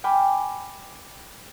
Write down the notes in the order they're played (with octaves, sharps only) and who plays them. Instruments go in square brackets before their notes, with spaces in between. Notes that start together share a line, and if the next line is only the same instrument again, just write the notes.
[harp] G5 G#5 B5 D6 F6